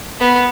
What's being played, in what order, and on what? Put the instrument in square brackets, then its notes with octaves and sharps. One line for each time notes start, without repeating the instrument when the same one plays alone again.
[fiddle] B3